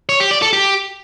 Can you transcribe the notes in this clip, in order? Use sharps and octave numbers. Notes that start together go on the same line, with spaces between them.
C#5
G4
D5
A4
G4